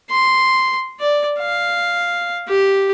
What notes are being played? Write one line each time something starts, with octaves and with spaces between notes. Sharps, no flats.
C6
D5
F5
G4